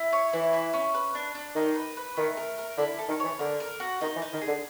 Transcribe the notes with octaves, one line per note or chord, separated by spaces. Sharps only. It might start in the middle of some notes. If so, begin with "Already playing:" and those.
Already playing: E4
C#5
E3 E4
E4
C#4
B4
D4
D4
D#3 D#4
B4
B4
D#3 A3
A#4
A#4
D3 E4
A4
D#3
E3 C#5
D3 A#4
A#4
F#4
D#3 D#4
E3
D#4
D#3
G#4
D3